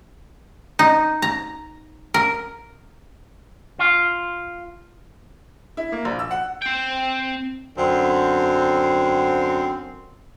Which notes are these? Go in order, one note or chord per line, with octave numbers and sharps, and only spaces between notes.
D#4
A#5
A#4
F4
E4
A#3
A#1
E6
F#5
C4 G5
F#2 D3 C4